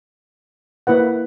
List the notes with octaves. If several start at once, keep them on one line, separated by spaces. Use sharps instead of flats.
A#3 E4 B4 F#5